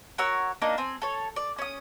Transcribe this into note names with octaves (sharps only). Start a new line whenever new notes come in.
F#4 A#4 C#5 E6
A#3 D4 D#4
C4 G#5
A4 C#5
D5
C#4 D#6